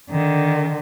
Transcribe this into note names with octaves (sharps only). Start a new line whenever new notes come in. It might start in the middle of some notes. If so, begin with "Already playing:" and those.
D3 D#3